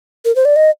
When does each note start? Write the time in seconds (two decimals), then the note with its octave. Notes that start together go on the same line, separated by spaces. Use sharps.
0.25 A#4
0.36 C5
0.45 D5
0.56 D#5